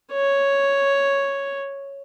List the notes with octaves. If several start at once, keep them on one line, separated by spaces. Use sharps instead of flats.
C#5